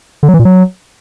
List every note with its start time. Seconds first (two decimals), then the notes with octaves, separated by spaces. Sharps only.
0.23 D3
0.28 F#3
0.34 E3
0.39 A#2
0.45 F#3